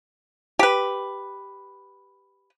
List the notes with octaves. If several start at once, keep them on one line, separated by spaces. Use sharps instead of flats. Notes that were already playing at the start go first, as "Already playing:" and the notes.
G4 B4